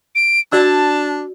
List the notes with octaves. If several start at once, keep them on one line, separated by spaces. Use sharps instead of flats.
D7
D4 F#4 D5 A5 E6